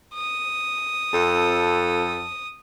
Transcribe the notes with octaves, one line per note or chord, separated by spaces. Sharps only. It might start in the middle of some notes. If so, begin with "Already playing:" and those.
D#6
F2 A4